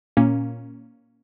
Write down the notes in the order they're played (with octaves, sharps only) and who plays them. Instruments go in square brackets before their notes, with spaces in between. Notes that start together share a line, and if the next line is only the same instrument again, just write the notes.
[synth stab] A#2 A#3 C#4